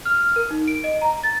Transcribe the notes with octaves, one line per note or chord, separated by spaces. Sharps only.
F6
A#4
D#4
D7
D#5
A#5
A6